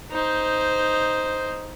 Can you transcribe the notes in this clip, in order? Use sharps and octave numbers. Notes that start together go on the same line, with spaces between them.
D#4 C5